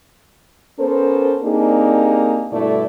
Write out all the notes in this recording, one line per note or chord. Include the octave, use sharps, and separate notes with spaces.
B3 C#4 A4 A#4 C5
A#3 C4 D4 D#4 G4 G#4
G2 B2 A3 E4 A4 D5